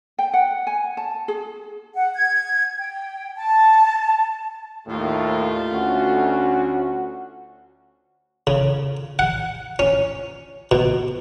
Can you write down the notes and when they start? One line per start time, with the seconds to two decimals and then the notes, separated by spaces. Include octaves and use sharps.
0.19 G5
0.33 F#5
0.67 G#5
0.97 A5
1.28 G#4
1.95 F#5
2.15 G#6
2.78 G5
3.36 A5
4.87 D#2 A2 A3 F4
5.73 D2 C#4 F#4
8.47 C#3
9.19 F#5
9.79 C#4
10.71 B2